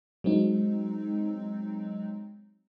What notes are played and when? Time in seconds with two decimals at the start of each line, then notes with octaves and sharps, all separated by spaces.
0.24 F#3 G#3 C4 D#4